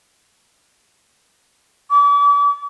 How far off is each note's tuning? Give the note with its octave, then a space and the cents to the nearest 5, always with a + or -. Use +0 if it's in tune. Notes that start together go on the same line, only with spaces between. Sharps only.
D6 -40